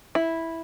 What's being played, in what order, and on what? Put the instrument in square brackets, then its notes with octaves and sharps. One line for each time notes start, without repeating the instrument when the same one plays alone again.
[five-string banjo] E4